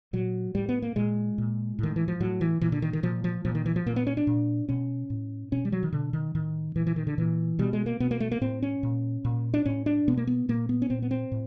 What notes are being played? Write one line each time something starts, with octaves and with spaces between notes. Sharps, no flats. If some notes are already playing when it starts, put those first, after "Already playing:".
A#2 F#3
A2 G3
B3
A#3
A#2 G#3
A#2
A2 D#3
E3
F3
A2 F#3
E3
A#2 E3
D3
D#3
D#3
A#2 F3
F3
A#2 F3
D#3
E3
F3
A#2 A#3
B3
C#4
D4
A#2
B2 C#4
A2
B2 C#4
G3
F#3
D#3
B2 D3
D#3
A2 D#3
A#2 E3
E3
D#3
D3
A#2 E3
B2 G3
G#3
A#3
B2 B3
A#3
A3
A#3
A2 C4
C#4
A#2
A#2
D4
A2 C#4
D4
B2 B3
A#3
B3
A#2 A#3
B3
C#4
A#2 C4
B3
C4
A2